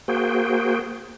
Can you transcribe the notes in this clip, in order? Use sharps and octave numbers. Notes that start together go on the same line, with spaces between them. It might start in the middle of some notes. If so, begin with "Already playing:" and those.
A#3 F#4 G#4 C5 G5